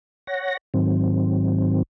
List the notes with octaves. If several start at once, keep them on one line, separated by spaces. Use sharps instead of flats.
C#5 F#5 A#6
G#2 D#3 F#3 C4